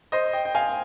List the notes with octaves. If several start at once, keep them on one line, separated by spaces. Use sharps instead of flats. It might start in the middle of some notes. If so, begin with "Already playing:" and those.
C5 D#5
D#5 G5
G5
F5 G#5